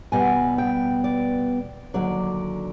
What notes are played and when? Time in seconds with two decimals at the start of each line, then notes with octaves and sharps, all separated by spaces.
0.12 B2 G3 B3 G#5
0.58 G5
1.04 D5
1.94 D#2 D3 F#3 D5